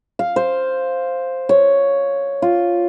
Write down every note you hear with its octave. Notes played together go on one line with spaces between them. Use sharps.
F5
C5
C#5
F4